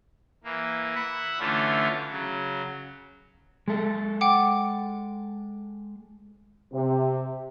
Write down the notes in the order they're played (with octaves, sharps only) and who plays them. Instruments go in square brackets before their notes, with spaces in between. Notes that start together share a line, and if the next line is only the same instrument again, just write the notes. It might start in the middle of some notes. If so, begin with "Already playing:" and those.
[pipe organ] E3 A#3
E5 F#5 B5
D3 E3 A3 C#4 D4 F4
C#3 F#3
[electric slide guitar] G#3 A4
[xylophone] F#5 G5 D6
[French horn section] C3